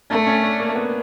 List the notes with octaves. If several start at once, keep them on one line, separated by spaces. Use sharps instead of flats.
A3 D4
C#4
D4
A#3
B3